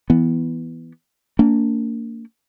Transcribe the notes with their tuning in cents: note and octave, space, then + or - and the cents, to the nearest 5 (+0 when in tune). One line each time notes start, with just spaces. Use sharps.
E3 +0 B3 +0
A#3 -30 D4 -35